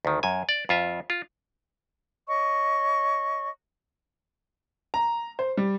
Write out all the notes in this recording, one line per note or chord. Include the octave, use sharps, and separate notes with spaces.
D2 D#3
F#2 G#5
D5
F2 F4 E5
F4
C#5 D#5 C#6
A#5
C5
G3